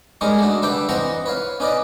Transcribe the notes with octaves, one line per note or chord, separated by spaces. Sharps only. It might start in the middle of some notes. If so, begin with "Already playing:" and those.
G3 G#3 C#4 D#4 A#4 C#5
A3 D4 F#4
D3 G3 B4 E5 G5 D6
E3 C4 D#4 F#5 A#5 C#6
B4 C#5 F5
C#4 D#4 B4 D5 D#5